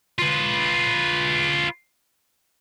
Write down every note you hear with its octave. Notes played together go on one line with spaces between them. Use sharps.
F4 B4